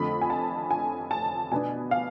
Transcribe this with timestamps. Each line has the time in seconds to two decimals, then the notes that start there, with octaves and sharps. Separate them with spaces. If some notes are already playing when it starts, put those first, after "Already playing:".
Already playing: F2 D3 A3 B5
0.22 G#5
0.30 A5
0.71 G#5
1.11 A5
1.52 B2 B3 D4 G#5
1.91 F5